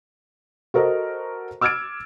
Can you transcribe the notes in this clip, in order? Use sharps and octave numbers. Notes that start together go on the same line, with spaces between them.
F#4 A4 A#4 C5 D#5
D6 E6 F6 G#6 A6 D7